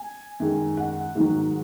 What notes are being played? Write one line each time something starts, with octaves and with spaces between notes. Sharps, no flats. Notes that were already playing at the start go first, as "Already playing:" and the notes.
Already playing: G#5
F#2 D#3 G#3
F#5
G#2 D#3 F#3